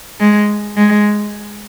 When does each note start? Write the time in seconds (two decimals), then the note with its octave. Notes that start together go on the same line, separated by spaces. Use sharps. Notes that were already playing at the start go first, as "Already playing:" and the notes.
0.19 G#3
0.77 G#3